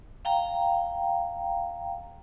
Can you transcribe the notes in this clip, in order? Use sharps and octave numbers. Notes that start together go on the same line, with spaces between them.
F5 G5 A#5